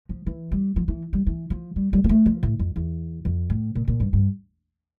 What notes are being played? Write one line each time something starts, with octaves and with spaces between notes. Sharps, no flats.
F3
E3
G3
F3
E3
G3
E3
F3
G3
G3
A#3
A3
F3
A2
F2
E2
F2
A2
A#2
A#2
G2
G2